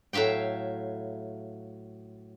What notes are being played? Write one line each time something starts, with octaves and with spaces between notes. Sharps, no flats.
A2 F#3 E5 F5 G5